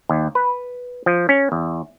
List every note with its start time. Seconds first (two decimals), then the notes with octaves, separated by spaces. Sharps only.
0.09 D#2
0.35 B4
1.06 F3
1.29 C#4
1.52 E2